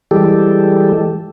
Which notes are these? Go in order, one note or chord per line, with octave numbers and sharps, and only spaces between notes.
E3 G3 G#3 G4 A4